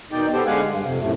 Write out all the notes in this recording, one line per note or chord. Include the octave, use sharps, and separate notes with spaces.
B2 D#3 D#4 D5 G5
B3 G4 A4 C5
D3 G#3 G4 F5 F#5 G#5
G2
F2 C3
F#2 A2 C3 A3